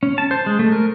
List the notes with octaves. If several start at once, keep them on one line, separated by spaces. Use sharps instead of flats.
C#4
A5
C5
G#3
A3
A#4